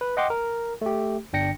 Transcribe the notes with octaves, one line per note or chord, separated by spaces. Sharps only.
B4
D#5 F#5 G5 C6 D6
A#4
A3 G4
G1 D4 G5 A#6 C#7